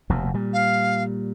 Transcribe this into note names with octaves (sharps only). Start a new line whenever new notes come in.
F1 D#2 B2
A#2 G3
F5